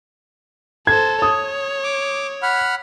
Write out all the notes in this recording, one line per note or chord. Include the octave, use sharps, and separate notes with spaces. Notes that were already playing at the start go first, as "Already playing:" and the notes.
A4 C5 G#6
C#5 D#6
D6
F#5 B5 F6